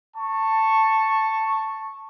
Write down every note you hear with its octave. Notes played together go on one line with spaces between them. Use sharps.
A5 C#6